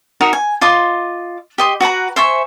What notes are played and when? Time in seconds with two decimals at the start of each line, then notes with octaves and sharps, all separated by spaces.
0.21 D#4 F#4 A#4 E5
0.33 G#5
0.61 F4 D#5 C6 D6
1.58 G4 D#5 C6
1.81 F#4 B4 F#5 A#5
2.16 C5 E5 G#5 C#6